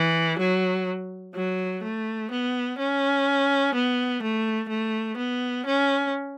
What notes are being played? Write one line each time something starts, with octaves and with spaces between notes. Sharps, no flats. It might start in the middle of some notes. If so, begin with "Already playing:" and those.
Already playing: E3
F#3
F#3
A3
B3
C#4
B3
A3
A3
B3
C#4